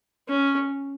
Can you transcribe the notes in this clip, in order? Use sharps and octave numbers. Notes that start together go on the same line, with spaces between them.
C#4